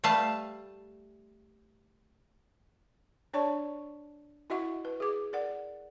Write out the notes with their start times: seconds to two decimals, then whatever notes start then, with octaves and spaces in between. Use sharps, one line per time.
0.04 G3 A3 B4 F5 A5
3.34 D4 C#5 D5 A5 C#6
4.50 E4 F#4 D#5 E5 F#5 C#6
4.85 B4
5.00 G#4 D6
5.33 A#4 D5 F#5